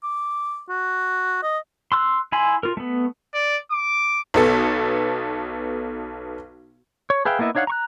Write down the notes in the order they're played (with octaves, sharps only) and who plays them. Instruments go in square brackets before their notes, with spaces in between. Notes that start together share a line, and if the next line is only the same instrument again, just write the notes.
[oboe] D6
F#4
D#5
[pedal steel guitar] C6 E6 F#6
E4 G#5 B5 C6
F4 A#4
A3 B3
[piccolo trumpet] D5
D6
[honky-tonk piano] B1 B3 A4
[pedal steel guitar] C#5
G#4 B4 E5 F5 G5
A#3 B3 E4 D#5 E5
D4 D#4 C#5 F5 F#5
A#5 C#6 F#6